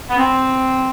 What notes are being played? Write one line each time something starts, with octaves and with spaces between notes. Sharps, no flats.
B3
C4